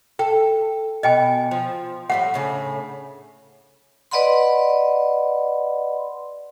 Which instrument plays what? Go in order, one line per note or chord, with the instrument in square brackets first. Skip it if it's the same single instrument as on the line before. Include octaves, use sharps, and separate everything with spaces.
[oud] A4 [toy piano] G5
[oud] B2 [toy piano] D#5 G5 G#5
[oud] F3
[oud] A2 G3 A3 [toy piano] F#5
[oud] A2 C#3 D4
[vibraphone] B4 D5 D#5 F#5 B5 C6